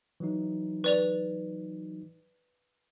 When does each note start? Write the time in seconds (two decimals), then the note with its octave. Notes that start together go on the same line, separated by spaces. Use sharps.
0.20 E3 F#3 D#4
0.84 B4 D5 F7